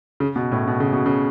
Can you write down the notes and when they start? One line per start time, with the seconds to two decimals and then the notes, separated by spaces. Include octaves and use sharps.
0.20 C#3
0.36 B2
0.52 A2
0.67 B2
0.80 C#3
0.93 B2
1.06 C#3